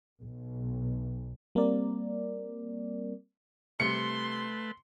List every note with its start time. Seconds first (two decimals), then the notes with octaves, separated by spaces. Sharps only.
0.22 B1
1.55 G3 A#3 C4 A#4 D5
3.80 C3 G3 A3 B4 C6 C#7